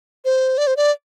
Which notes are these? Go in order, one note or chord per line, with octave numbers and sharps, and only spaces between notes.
C5
D5
C5
D5